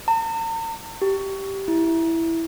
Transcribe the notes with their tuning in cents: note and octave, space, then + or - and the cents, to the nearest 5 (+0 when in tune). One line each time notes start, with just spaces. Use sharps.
A#5 -45
G4 -5
E4 +0